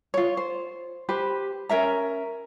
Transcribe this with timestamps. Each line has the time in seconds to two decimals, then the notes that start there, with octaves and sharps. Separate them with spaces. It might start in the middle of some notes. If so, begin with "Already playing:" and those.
0.14 F4 C#5
0.37 C5
1.09 G4 B4 C5
1.69 C#4 A#4 E5 A#5